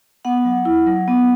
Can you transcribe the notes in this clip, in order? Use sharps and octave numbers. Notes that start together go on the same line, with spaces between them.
B3 F#5
F#3
E4
F#3
B3